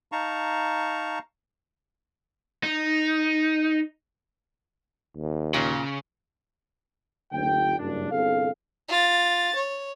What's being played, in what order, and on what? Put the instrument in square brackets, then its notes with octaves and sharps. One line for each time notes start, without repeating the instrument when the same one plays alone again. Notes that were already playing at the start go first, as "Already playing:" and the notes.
[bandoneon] D#4 F5 A5 A#5 C#6
[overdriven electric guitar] D#4
[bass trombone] D#2
[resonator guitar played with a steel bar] A#2 [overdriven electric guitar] C#3
[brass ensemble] F#1 D2 G5
F#1 G2 D4
G1 C2 C3 G#4 A4 F5
[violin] F4 A6
C#5